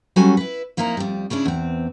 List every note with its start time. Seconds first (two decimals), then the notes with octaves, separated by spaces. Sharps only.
0.16 F#3 G3 C#4 F#4 A4 G#5
0.37 E4 B4
0.77 F2 A#3 D#4 E4 A4 A#5
0.97 F2 G3
1.30 C#3 C#4 D4 E4
1.45 E2 C4